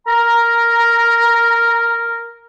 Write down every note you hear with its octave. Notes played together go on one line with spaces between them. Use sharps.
A#4 A#5